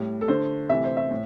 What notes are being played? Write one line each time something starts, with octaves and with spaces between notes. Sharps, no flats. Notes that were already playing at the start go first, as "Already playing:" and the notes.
Already playing: A2 G3
A4
D3 A3 C5
C3 E3 A3 E5
C5
E5
A2